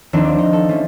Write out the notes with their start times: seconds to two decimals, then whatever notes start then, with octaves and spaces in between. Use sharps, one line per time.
0.13 D#2 F3 C4 D4 D#4
0.25 D5
0.39 D#4
0.53 A4
0.69 F3 A3 C#4